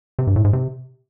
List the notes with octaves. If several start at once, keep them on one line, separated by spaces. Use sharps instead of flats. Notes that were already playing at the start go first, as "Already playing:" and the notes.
C3
G2
A2
G#2
C3